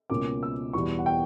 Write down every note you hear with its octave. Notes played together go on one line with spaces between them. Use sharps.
C#2 B2 A#3 C#4 D6
E6
E2 B2 G3 B3 C#6
F#5
G5